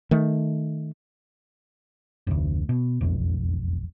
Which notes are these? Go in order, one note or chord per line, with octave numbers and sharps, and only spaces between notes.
D#3 A3
F1 D2
B2
E1 B1 F2